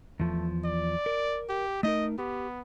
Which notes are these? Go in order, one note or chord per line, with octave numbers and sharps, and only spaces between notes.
E2 F3 A3
D5
A#4
G4
A3 D#4 A#4 D#5
B3 G4